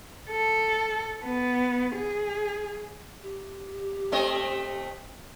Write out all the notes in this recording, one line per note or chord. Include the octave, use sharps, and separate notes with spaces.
A4
B3
G#4
G4
A3 C4 D#5